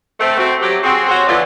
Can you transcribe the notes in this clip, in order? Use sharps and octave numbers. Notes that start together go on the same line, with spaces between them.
A3 C4
C4 F#4
F#3 G4
C4 F#4 G#4
F#4 C5 C#5
D3 E3 F3 B3 F4 D5